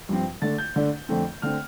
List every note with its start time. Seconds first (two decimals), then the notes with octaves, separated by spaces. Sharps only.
0.09 G2 F3 C4
0.42 D3 A3 D4 A6
0.58 G6
0.76 D3 A3 D4
1.09 F2 D3 A3 C4
1.42 D3 A3 C4 F6